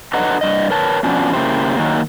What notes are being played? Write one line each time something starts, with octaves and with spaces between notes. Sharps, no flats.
D3 F#3 B4 D#5 F#5 A#5
G2 D#5
A#4 B4 C#5 A5
F2 B2 F3 C#4 D4
C#3 A#3 E4 G4 C5
D#3 F#3 A#3